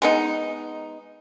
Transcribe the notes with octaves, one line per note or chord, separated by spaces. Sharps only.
G#3 B3 D#4